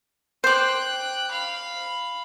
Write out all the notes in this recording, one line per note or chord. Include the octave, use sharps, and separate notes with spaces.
C5 G5 D6 F#6
F5 B5